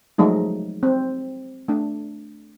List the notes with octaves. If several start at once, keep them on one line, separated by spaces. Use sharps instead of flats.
F3 F#3 G#3 A3 D#4
C4
A3 D4